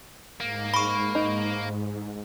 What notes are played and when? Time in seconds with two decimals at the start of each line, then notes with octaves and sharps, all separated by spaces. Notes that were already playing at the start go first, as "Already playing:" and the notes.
0.40 G#2 A#3
0.74 B5 C#6
1.15 D#4